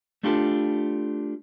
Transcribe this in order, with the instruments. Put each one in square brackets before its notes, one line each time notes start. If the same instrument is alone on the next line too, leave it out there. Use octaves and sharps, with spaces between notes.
[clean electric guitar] A3 D4 F4 G4 A4